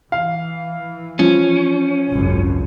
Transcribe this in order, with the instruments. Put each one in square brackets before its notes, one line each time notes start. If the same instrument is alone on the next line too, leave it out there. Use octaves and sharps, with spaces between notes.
[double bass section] E3 [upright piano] F5
[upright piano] F3 [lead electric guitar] C#4
[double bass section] G#1 C#2 F#2